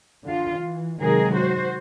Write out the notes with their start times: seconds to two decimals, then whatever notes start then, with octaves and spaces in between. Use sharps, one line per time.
0.25 D3 F4
0.58 E3
1.00 C3 D#3 F#3 G#3 G#4 A#4
1.34 F#4 C5